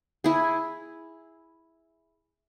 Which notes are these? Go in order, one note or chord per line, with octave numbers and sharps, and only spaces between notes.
E4 G#4